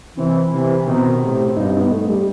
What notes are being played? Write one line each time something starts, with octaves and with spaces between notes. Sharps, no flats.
C3 E3 C4
C3 E3
B2 D#3 C4
A2 C3
C4
G2 B2 D#4
D#4
B3
A3
G3